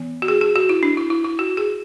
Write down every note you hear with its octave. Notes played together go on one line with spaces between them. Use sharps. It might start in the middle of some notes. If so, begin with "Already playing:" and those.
Already playing: E3 B3
F#4
G#4
G#4
F#4
E4
D4
E4
E4
E4
F#4
G#4